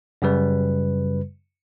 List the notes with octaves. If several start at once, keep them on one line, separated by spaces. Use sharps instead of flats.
F#2 C#3 G3 B4